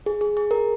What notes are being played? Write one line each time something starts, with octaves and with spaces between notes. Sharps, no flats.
G#4
G#4
G#4
A#4